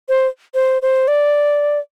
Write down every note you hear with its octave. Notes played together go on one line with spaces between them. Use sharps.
C5
C5
C5
D5